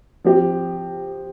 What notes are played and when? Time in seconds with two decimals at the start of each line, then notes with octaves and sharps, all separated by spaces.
0.24 F3 C4 G4